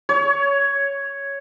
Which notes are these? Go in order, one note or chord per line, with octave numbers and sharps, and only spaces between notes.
C#5